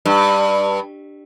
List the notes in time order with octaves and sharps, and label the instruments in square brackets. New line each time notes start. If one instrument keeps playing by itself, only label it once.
[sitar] G2